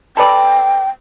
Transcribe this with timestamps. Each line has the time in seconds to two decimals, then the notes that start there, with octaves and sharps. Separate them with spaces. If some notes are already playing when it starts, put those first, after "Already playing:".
0.17 A4 B4 D5 G5